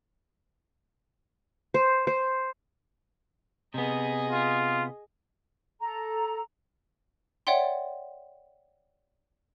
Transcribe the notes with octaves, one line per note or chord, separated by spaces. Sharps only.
C5
C5
C3 B3 G#4 D#5
F4
A4 A#5
C#5 D5 E5 F#5 G5 C6